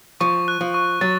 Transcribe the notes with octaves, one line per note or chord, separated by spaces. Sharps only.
F3 C#6
F#6
F3
C#6
F#3 A6